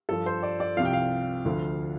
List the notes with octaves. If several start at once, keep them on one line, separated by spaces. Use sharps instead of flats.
G2 F3 A4
C5
D5
D5
C2 C3 F3 F5
G5
F5
D2 D3 F3